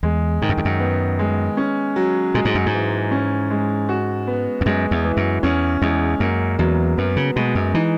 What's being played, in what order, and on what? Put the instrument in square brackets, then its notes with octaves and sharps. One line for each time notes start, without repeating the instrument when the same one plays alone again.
[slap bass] E2 [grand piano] G#3
[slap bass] G#2 [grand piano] D#3
[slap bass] F#2
E2
F#2
[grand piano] B3
G#3
C#4
F#3
[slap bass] A#2 [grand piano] G#3
[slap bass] G#2
F#2
G#2
[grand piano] E3
C#4
G#3
F#4
B3
[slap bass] E2
[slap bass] F#2 [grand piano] G#3
[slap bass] E2
[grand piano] E3
[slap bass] F#2
[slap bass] E2 [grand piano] C#4
[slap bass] E2 [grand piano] G#3
[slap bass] F#2 [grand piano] A#3
[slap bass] E2 [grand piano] F#3
[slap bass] F#2 [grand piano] B3
[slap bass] C#3
[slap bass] B2 [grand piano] G#3
[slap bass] F#2
[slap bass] E3 [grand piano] D#4